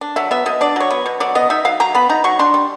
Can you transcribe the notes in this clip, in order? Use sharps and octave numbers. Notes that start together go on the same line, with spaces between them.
D4
F#3 E5
B3 E5
B2 D#5
D4 D5
F#3 C#5
B3
B2
F#3 D5
B3 D#5
D#4 E5
F#3 F5
F#3 A#5
B3 B5
D#4 A#5
F#3 C#6
D4 C6
G3